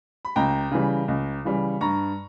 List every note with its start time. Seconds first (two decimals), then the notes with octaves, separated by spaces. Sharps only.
0.25 B5
0.36 C#2 G5 A#5
0.71 C#3 E3 G3
1.08 C#2
1.45 C#3 E3 G3
1.81 G2 A#5 C#6